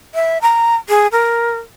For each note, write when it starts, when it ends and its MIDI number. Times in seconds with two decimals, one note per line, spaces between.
0.15 0.38 76
0.42 0.75 82
0.89 1.07 68
1.12 1.54 70